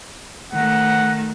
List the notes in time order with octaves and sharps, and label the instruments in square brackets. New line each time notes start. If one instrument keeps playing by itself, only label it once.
[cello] D#3 A3 [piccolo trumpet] F#5